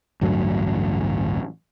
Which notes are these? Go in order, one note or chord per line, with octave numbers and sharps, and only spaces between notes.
A1 D2 G2 F#3